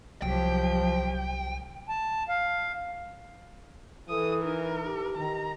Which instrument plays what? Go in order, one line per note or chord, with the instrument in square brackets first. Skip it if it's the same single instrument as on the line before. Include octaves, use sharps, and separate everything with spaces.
[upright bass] C2 [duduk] F3 [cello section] F#3 G4 [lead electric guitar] G5
[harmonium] A5
F5
[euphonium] E3 [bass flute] A4 [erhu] D#6
[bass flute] D#4 [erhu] A#4
[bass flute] G4
[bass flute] D#3 [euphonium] G4 [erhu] A#5